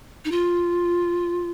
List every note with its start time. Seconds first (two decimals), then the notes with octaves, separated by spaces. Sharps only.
0.25 D#4
0.31 F4